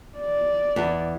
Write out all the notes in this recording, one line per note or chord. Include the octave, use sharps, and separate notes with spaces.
D5
E2